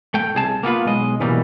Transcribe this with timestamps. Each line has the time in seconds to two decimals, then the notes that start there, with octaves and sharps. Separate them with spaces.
0.14 A3 G5
0.35 C2 G#4 A5
0.63 A#3 B3 F4 B4
0.85 B1 G#3 D#5
1.20 B2 E3 F#3 G3 A#3